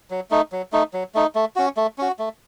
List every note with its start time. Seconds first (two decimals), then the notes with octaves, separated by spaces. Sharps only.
0.10 F#3
0.31 A3 D#4
0.52 F#3
0.72 A3 D#4
0.93 F#3
1.15 A3 D#4
1.35 A3
1.56 C#4 F#4
1.77 A3
1.98 C#4 F#4
2.19 A3